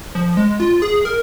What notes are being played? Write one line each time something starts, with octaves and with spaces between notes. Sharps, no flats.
F3
G#3
F4
G#4
A#4